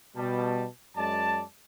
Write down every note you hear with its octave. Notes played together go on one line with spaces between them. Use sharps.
B2 G3 A5
F#2 G#3 D5 A5